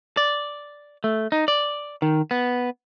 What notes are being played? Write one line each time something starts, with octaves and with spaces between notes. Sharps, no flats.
D5
A3
D#4
D5
D#3
B3